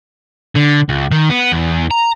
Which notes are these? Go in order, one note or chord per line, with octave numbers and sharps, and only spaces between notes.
D3
C#2
D#3
B3
E2
A#5